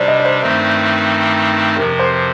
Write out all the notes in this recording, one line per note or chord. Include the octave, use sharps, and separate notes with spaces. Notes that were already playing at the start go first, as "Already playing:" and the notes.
Already playing: C3 G3 D4 C5 D5
D#5
D5
C5
G2 D#3 A3 C4 D#4
F2 C3 F3 A#4
C5